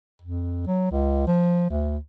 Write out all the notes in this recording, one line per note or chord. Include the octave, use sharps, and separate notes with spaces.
F2
F#3
C#2
F3
D2